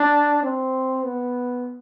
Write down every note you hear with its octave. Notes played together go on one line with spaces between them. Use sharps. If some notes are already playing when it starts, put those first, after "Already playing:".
Already playing: D4
C4
B3